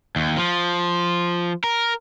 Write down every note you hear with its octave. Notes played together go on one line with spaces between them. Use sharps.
D#2
F3
A#4